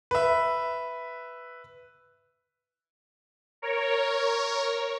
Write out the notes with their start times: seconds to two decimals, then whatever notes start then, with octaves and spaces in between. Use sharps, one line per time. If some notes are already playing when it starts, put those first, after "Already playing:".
0.11 B4 E5
3.62 A#4 C#5